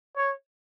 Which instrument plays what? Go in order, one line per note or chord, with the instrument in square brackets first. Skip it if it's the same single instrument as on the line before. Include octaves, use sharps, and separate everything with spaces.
[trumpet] C#5